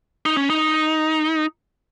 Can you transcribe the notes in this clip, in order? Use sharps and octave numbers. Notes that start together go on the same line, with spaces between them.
D#4
C#4
D#4